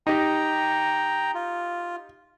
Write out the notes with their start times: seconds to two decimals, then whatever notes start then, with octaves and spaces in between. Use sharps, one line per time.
0.07 D#4 G4 G5 A#5
1.34 F4